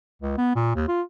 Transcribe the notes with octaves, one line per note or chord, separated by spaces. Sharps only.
C#2
B3
A#2
D#2
F4